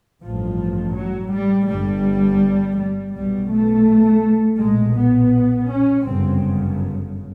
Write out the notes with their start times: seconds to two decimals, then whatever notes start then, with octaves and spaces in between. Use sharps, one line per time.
0.22 A1 G2 F3
0.95 F#3
1.32 G3
1.68 G1 G2 G3
2.77 G3
3.14 B1 B2 G3
3.49 A3
4.58 B1 A#2 G#3
4.95 B3
5.68 C#4
6.04 G1 F#2 C#3 C4